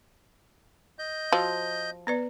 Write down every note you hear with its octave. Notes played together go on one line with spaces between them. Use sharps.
D#5 G6
F3 F#4
B3 B4 D5